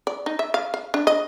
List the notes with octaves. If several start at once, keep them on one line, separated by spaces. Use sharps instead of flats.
D5
D#4
E5
F5
F5
D4
D#5